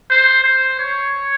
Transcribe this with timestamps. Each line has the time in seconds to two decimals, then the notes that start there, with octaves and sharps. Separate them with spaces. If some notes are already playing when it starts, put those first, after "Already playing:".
0.10 C5
0.44 C5
0.79 C#5